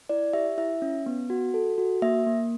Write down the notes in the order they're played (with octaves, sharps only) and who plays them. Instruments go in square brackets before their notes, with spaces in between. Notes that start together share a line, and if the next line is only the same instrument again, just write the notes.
[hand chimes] E4 D5
G4 E5
E4 E5
C#4
B3
F#4
A4
F#4
A#3 E5
A#3